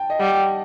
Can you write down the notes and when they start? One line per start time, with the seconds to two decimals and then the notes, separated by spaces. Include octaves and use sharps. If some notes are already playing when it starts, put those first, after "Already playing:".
Already playing: G5 A5
0.10 D#5
0.19 G3 F#5